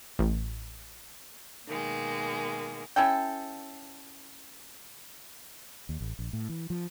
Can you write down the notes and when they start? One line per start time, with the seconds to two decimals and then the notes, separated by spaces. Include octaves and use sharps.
0.19 A1
1.68 B2 D#3 G#3 A#3
2.96 C#4 E4 A4 G5
5.89 D#2
6.01 A1
6.19 A#1
6.33 A2
6.49 E3
6.70 F3